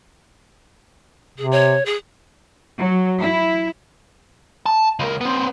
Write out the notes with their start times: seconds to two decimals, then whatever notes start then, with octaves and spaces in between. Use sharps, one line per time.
1.38 C3 G#4
1.51 C#5
1.85 G#4
2.78 F#3
3.20 E4
4.66 A5
5.00 C#2 A#4
5.21 B3 C4